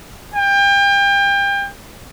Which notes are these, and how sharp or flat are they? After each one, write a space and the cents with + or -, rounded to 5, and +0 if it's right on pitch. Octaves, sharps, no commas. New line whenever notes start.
G5 +30